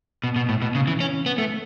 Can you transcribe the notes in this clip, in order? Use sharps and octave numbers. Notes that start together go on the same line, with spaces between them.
B2
B2
A2
B2
C#3
E3
C#4
B3
A3